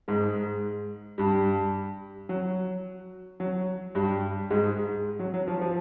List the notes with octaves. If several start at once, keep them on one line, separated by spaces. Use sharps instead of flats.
G#2 G#3
G2 G3
F#3
F#3
G2 G3
G#2 G#3
F#3
F#3
F3
F3